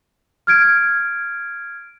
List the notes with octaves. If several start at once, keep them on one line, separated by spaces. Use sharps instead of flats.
F6 G#6 D7